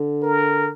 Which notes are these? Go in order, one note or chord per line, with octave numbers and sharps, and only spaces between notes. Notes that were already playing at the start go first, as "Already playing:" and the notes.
Already playing: D3
A#4